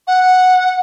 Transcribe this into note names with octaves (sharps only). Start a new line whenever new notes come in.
F#5